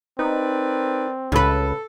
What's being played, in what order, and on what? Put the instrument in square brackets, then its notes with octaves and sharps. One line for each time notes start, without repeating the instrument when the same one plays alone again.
[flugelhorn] C4 [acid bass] D#4 [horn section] A#4 B4 D5
[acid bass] C#2 [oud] C#3 B4 [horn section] A4